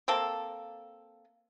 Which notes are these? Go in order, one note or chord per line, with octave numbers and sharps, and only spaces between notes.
A#3 C4 A4